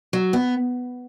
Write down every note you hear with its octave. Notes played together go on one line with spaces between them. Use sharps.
F#3
B3